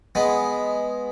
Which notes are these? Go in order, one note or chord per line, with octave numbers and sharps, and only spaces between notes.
G#3 B3